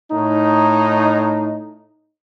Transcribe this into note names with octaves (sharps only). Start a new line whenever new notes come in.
A2 D#4